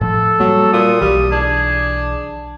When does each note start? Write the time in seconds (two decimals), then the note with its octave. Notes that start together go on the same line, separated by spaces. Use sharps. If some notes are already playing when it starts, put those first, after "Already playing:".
0.01 A2 F3 A4
0.40 F#3 G3 A#3
0.73 A#2 D#6
1.01 B1 E3 G3
1.32 D4 G#4